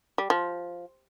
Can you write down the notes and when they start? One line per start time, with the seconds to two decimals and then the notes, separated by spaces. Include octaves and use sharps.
0.18 G3
0.30 F3